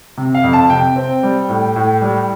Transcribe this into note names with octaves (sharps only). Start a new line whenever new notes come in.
C3
F5
F2
A5
C3 G5
C4
G3
A2
A2
G3